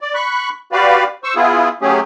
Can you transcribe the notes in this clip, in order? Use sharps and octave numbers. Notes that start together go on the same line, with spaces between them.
D5
B5 C#6 F#6
F#4 G4 B4 D5 F5
C5 C#6 E6
B3 E4 F4 G#4
F#3 A3 C#4 G4 G#4